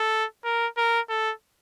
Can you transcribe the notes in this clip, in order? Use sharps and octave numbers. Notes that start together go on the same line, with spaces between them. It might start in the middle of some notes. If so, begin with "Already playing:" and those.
Already playing: A4
A#4
A#4
A4